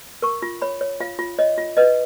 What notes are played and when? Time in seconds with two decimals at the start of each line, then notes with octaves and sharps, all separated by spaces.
0.22 A#4 C#6
0.42 F4
0.62 C#5 B5
0.81 C#5
1.00 F4 F5
1.19 F4
1.39 C#5 D#5
1.58 F4
1.77 B4 D#5